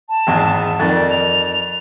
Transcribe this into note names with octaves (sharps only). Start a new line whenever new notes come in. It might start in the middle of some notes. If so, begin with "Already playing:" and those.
A5
G#1 E2 G#2
F2 D#3 D5 A6
F7